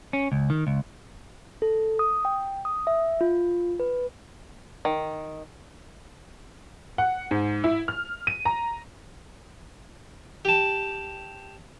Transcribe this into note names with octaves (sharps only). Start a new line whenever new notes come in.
C#4
C#2
D#3
C#2
A4
D#6
G5
D#6
E5
F4
B4
D#3
F#5
G#2
E4
F6
D#7
A#5
G4 A5